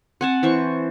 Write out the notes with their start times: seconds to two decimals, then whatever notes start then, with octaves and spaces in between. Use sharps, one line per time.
0.21 C4 F#5 G#5 A5
0.43 E3 C5 C#6